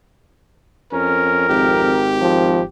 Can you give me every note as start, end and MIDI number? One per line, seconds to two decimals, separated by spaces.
0.93 1.93 41
0.93 1.49 61
0.93 2.14 70
1.49 2.64 32
1.49 2.66 67
2.21 2.62 53